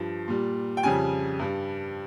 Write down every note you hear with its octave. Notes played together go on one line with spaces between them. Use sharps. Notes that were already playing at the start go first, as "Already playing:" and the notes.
Already playing: G2 F3
A#2 G3
G5
F2 C#3 G3 G#5
G2 G3